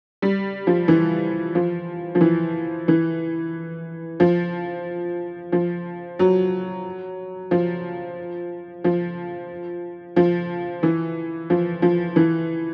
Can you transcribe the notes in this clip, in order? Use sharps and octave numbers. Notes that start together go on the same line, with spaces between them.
G3
F3
E3
F3
F3
E3
E3
F3
F3
F#3
F3
F3
F3
E3
F3
F3
E3